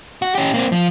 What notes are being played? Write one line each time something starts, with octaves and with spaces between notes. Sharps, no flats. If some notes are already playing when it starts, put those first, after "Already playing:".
F#4
C#4 G4
A#3 C4
F3